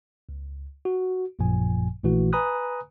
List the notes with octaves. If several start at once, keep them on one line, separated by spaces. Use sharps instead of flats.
C#2
F#4
A1 F#2 A#2 F3 G#5
A#1 A#2 E3 A3 F#4
B4 G#5 A#5 B5 D#6 F#6